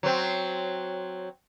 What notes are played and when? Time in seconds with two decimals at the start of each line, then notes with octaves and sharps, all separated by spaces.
0.03 F#3 C4